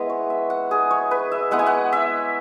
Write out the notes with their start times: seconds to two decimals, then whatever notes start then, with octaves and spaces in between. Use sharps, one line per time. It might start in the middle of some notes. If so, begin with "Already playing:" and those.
Already playing: G#3 B3 E4 B4
0.10 C#5
0.30 E5
0.50 F#5
0.71 G#4
0.91 C#5
1.11 B4
1.32 E5
1.51 G#3 B3 E4 F#5
1.59 G#5
1.66 F#5
1.93 E5